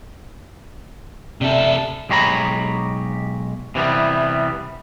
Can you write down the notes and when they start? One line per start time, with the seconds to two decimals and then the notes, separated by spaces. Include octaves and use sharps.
1.41 C3 A4 D5 E5
2.09 B1 G#3 G4 C#5 A#5 B5
3.75 C3 E3 G3 B3